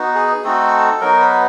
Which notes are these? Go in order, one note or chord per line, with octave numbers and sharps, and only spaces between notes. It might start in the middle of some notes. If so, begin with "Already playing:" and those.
Already playing: B3 D#4 F#4
G#4
A3 C4 D#4 F#4 A4
F#3 B3 D#4 F#4 A#4
B4